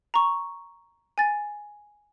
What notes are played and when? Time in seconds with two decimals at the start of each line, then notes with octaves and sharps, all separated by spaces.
0.14 A#5 C#6
1.18 G#5 A6